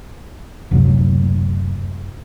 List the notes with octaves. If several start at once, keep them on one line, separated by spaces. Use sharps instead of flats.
F#1 D2 C3 F#3